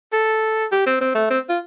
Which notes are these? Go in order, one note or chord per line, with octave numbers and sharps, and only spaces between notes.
A4
G4
C4
C4
A3
C4
F4